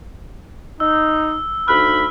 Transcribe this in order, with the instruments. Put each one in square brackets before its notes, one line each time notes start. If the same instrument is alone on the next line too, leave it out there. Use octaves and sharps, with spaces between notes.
[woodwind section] D#4 [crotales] E6
[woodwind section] D2 D#4 B5 [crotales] F6